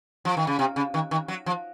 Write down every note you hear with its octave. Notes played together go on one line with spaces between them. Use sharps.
F3
D#3
C#3
C3
C#3
D#3
D#3
F#3
F3